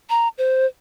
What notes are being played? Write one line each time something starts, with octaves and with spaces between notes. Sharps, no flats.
A#5
C5